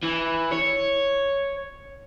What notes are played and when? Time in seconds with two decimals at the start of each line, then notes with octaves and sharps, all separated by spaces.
0.03 E3
0.51 C#5